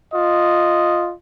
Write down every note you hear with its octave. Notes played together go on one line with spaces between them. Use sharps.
F4 D#5